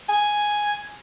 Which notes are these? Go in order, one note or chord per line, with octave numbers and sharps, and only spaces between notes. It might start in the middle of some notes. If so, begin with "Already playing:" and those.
G#5